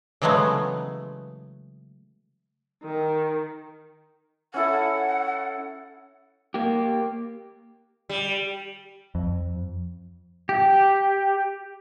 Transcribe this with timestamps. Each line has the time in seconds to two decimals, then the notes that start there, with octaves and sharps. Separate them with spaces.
0.22 C#3 E3 F#3 G#3 A3 B3
2.84 D#3
4.54 C#4 E4 A4 F#5
6.54 A#3 G4
8.09 G3
9.15 F2
10.49 G4